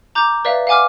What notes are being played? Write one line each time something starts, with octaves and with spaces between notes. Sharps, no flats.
A#5 D6 G6
B4 D5 E5 F5
F5 F#5 G#5 D6 F6